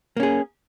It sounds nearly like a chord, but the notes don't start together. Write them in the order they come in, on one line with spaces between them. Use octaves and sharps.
A#3 C#4 G#4